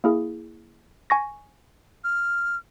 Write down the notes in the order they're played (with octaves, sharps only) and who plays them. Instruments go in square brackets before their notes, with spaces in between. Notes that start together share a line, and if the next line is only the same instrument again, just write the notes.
[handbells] A#3 E4 G#4
G#5 C#6 A#6
[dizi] F6